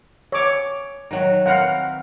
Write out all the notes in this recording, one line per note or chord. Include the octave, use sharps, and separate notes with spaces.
C#5 D6
D#3 F#3 F#4
C4 A#4 B4 F5 F#5